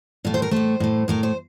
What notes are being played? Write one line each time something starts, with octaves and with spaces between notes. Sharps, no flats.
A2 A3 F4
C5
A#4
A2 A3 C5
A2 A3
A2 A3 A#4
C5